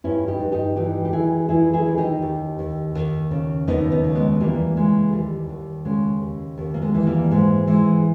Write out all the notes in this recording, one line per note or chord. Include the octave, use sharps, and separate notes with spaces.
G2 C#4 E4
D#4 G4
G2
D#4 G4
E3 D#4 G4
G4
E3 E4 G#4
E3 E4 G#4
E4 G#4
D#2
D#4 G4
D#2
D#2
D#2
C#3
D#2 B3 D#4
B3 D#4
C#3
G#3 B3
E3 G3 A#3
C#3 G#3
D#2 G3
D#2
C#3 G#3
D#2
D#2
A#3
G#3
E3
G3 A#3
G#2 G#3
E3 G#3